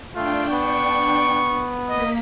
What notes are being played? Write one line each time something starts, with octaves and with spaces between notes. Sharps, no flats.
A3 D4 F4 G5
B3 C#6
A#3 D#5 B6